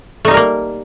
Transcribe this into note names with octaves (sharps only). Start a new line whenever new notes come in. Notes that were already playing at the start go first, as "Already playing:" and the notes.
G3 A3 A#3 D#4 A#4